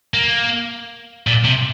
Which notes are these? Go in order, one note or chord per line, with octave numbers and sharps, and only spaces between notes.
A#3
A#2
C3